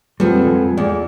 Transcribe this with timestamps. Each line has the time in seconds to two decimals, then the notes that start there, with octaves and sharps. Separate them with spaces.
0.20 F2 G3 B3
0.45 G#3 A4
0.77 E2 D5